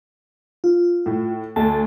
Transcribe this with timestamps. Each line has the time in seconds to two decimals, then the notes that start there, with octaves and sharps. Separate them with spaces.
0.64 F4
1.06 A2
1.56 D2 A5